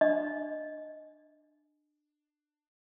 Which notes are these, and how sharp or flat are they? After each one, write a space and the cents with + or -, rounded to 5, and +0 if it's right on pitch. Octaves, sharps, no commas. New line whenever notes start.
D4 +25 D#5 +0